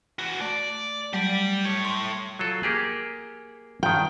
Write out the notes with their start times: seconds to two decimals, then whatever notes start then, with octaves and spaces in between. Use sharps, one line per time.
0.19 E3 F#4
0.41 A3 D5
1.13 F#3 G3 A3 G4 D5
1.65 A2 C#5 G#6
1.85 C6
2.39 F#3 F4 A4
2.63 A#3 G4 G#4
3.83 G2 D#3 G5